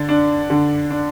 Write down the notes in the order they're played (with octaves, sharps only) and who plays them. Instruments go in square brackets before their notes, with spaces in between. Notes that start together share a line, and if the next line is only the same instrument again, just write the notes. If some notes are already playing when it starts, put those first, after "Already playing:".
Already playing: [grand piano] D3 D5
D4
D3
D4